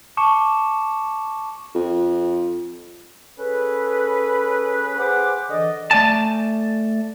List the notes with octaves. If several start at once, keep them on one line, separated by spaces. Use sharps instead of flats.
A5 C#6 D6 C#7 E7
F2
C#4 G#4 A4 B4
G#4 B4 C5 F#5 D6
D3 E3 D5 D#5
A3 D5 G#5 A5